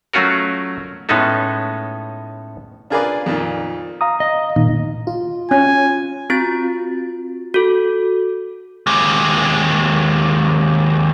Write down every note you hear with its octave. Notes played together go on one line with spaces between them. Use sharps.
F#3 A3 C#4 F4 F#4 A#4
A2 G#3 B3 C#4 D#4 A4
D4 F4 G#4 A#4 B4 D5
F2 A#2 D#3
F5 A#5 D#6
D#5
A#2 D#3
F4
C#4 G#5
C4 F4 F#4 A6
F#4 A4
D#2 G#3